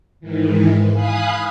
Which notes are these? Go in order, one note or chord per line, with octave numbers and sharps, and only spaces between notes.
G#2 D#3 E3
F5 G#5 B5 D#6 F#6